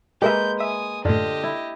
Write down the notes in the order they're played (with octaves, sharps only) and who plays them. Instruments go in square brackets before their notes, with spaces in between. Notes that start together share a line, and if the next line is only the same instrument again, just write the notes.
[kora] G#3 A#3 B4 [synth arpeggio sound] G4 A#4 E5 [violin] G6
[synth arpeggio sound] E5 [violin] G#5 D#6
[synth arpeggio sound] F#2 A2 [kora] D3 F4 [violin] G4 D#5
[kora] E4